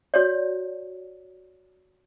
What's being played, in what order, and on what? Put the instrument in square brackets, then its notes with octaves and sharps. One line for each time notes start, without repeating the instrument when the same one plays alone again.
[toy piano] F#4 C#5 D5